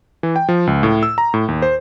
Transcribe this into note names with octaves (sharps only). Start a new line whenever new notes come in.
E3
G5
F3
C#2
A2
E6
A#5
A2
D#2
C5